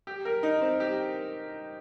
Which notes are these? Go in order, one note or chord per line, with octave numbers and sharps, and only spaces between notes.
G4
A#4
D#4
C4
G4